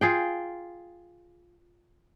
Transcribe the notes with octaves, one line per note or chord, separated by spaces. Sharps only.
F4 G#4 G5